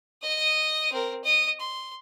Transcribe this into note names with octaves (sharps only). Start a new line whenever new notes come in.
D#5 D#6
C4 A#4
D#5 D#6
C6